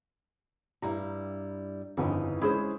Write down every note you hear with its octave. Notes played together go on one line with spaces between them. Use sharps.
G2 G3 E4 A#5
G1 F2 C#3 E3 D#4
G#3 C#4 E4 G#4 C5 D#6